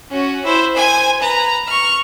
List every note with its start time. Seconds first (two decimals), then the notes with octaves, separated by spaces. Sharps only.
0.11 C#4 F#4
0.45 E4 C5
0.76 C5 G#5
1.20 B4 A#5
1.67 C#6 F6